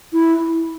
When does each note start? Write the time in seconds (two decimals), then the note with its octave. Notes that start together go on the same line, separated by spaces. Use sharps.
0.13 E4